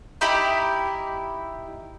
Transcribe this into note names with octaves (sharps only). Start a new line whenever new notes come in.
D#4 E4 G4 B5